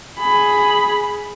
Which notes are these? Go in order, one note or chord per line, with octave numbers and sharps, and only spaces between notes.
G#4 B5